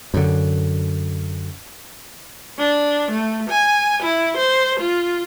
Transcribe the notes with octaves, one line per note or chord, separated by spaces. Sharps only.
F#2 D3
D4
A3
G#5
E4
C5
F4